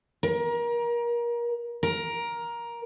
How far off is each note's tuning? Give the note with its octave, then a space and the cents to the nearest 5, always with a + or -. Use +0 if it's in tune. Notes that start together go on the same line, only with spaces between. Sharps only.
A#4 +30
A#4 +15